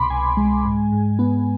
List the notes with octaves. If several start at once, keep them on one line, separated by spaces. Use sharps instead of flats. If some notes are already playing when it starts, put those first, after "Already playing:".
Already playing: C2 B2 B5 C6 D6
C2 G#5
G#3
G#2
G#2
B3